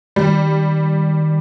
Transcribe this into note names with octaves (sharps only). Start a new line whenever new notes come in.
D#3 G3